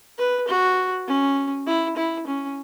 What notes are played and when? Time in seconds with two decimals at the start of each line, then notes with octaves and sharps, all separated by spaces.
0.18 B4
0.48 F#4
1.07 C#4
1.67 E4
1.97 E4
2.27 C#4